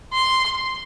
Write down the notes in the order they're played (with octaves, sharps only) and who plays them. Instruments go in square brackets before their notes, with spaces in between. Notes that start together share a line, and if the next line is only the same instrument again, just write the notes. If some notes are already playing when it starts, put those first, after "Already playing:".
[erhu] C6